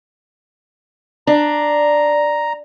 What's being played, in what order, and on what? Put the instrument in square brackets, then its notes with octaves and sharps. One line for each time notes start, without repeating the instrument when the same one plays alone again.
[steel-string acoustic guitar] D4 [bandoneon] A#5